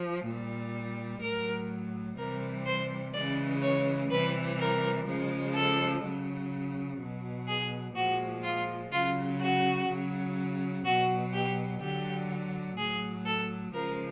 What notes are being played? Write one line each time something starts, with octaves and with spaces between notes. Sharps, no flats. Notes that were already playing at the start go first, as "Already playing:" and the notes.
Already playing: F3
A#2 G3
A2 F#3 A#4
C3 E3 G3 A#4
C5
C#3 E3 G#3 D5
C#5
C3 E3 G3 B4
A#4
C#3 F3 G#3
A4
C#3 F#3
B2 F#3
G#4
A#2 F3 G#3 F#4
F4
C#3 F#3 F4
F#4
C#3 F#3
B2 F#3 F#4
G4
D3 F#3 G4
A2 F#3 G#4
A4
C#3 F3 G#3 A#4